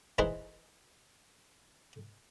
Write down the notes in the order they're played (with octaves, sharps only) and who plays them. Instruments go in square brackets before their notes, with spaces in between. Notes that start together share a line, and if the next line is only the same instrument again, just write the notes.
[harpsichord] E3 D#4 E4 G#4 B4 C5